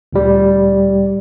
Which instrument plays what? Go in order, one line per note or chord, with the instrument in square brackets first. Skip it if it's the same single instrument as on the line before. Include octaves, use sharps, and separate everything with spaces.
[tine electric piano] D2 A#2 G3